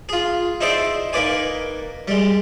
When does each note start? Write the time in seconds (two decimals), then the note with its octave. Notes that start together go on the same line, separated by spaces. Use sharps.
0.09 F4 G#4
0.61 D#4 E4 G#4 C5 D5
1.13 A#3 D#4 B4 D5 G#5
2.08 G3 G#3